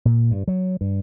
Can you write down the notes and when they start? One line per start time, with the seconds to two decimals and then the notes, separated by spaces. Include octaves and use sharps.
0.05 A#2
0.31 G2
0.48 F#3
0.81 G2